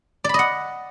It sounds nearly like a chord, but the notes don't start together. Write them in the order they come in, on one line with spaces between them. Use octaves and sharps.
D5 B5 D#5 F#5